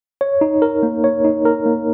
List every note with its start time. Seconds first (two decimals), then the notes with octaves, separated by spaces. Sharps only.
0.21 C#5
0.41 D#4
0.62 A#4
0.83 A#3
1.04 C#5
1.24 D#4
1.45 A#4
1.66 A#3